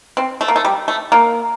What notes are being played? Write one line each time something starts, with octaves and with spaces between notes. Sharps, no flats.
C4
A3
A#3
A3
G3
A3
A#3